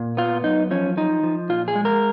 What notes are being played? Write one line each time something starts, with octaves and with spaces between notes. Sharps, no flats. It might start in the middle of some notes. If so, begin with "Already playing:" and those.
Already playing: A#2
B3 F4
F#2 D#4
F3 C#4
F3 D#4
F3
A#2 F4
G#4
G#3
A#4